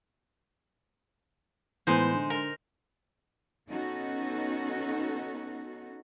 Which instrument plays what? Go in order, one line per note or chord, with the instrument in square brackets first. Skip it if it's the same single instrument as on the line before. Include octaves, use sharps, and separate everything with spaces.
[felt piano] A2 E3 B3 [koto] G#3 D#4 C5
[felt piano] D3
[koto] A#4
[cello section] B3 C#4 D#4 F#4 A4